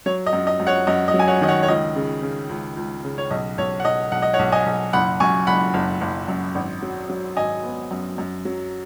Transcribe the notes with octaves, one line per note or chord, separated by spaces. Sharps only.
F#3 C#5
D#5
F#2
D#5
F#2
C#5 F#5
F#2 D#5
D#5
F#3
G#5
C#5 F#5
D#3 D#5
C#5 F#5
C#5
C#2 D#5
C#3
C#3
C#2
C#2
C#3
C#5
B1 D#5
B1 C#5
F#5
B1 D#5
B1 F#5
D#5
C#5 F#5
B1
D#5 G#5
B1
F#1 F#5 B5
F#2 G#5 C#6
F#1 F#5 B5
F#1
F#1
F#2
G#1
F#3
F#3
G#1 D#5 G#5
B3
F#2
F#2
F#3